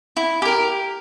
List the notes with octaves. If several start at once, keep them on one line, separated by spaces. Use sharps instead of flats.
E4
G4 A#4